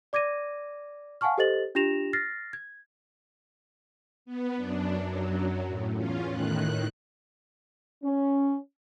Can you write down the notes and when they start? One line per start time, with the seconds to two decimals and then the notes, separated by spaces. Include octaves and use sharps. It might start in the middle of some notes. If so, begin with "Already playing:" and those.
0.13 D5 D6 G#6 A#6 D#7
1.21 F5 F#5 G#5 A5 C#6 F6
1.38 G4 A4 C5 D#5 A6 F#7
1.75 D4 F4 G4 A#6 E7 F7
2.13 F6 A6 A#6 C7
2.53 G#6
4.25 B3
4.57 F#2 D4
4.98 F#2 F#3
5.67 A2
5.96 E2 C#4 F4
6.28 A2 D#3 F#6
8.04 C#4